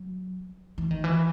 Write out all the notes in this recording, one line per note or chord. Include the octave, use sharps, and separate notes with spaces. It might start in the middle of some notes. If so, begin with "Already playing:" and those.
Already playing: F#3
E3
D#3
E3